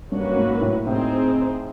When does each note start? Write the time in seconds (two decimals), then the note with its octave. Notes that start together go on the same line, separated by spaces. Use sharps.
0.11 G2 F#3 A#3 C#4 F#4 B4
0.37 G#2
0.61 A2
0.86 A2 C4 D#4 G#4 C5